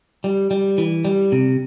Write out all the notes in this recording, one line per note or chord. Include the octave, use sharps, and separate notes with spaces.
G3
G3
E3
G3
C3